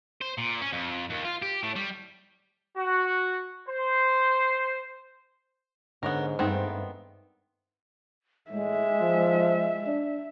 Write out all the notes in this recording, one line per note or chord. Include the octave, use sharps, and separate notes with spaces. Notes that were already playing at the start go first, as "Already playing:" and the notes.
C5
A#2
C#4
F2
D#2
F4
G4
A2
G3
F#4
C5
G#2 D3 B3 C#4 A#4
G2 D#3 A3 B3 C4 D#4
A2 G#3 E5
F3
D4